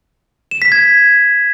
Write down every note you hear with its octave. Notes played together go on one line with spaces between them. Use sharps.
E7
B6
G#6